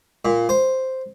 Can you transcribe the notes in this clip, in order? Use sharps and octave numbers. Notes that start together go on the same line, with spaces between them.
A#2
C5